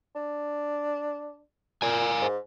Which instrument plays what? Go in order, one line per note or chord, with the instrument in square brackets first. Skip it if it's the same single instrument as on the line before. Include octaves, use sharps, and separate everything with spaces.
[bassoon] D4
[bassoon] A#2 [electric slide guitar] A#4 F5 G#5
[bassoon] G#2